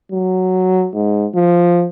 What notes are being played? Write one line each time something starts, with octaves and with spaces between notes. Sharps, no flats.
F#3
G#2
F3